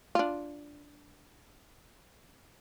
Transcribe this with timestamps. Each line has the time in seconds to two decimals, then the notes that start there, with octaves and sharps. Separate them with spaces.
0.15 D4 F4